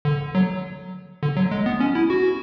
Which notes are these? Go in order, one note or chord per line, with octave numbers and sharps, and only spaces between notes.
D3
F#3
D3
F#3
G#3
B3
C#4
E4
F#4